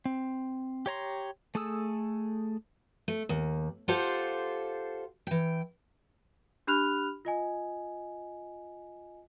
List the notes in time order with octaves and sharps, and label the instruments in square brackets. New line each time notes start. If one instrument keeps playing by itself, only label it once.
[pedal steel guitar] C4
G4 C#5 A#5 C6
A3 G#4 A4 D#6 E6
[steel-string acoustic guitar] A3
D#2
F4 G4 A4 C5 F#5
E3 G5
[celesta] D4 G4 B5 F6 F#6 F7
F4 D#5 G#5